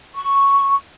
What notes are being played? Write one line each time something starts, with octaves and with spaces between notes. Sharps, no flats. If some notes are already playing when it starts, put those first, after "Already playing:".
C#6